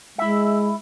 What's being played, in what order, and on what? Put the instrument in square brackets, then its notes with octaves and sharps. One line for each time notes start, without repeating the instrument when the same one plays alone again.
[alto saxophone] G#3 [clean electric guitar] E4 E5